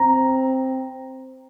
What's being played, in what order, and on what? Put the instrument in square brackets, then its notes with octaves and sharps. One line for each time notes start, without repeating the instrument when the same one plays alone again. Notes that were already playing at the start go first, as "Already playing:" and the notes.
Already playing: [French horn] C4 [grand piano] A#5